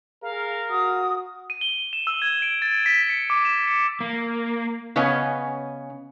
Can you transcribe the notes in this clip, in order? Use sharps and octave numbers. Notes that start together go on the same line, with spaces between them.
G#4 A#4 F5
F#4 D#6
D#7
G7
E7
E6
G#6
D7
A6
B6
C#7
D6
E7
C#7
A#3
C#3 B3 C#4 C#5 D#5 G#5